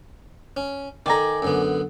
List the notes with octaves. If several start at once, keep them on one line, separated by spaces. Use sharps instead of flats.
C#4
D#3 A4 D5 G#5 A#5
F#2 D3 B3